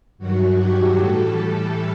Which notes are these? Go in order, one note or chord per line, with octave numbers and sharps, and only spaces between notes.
G2 D#3 F#3 F#4
G4
A2 E3 G3 A4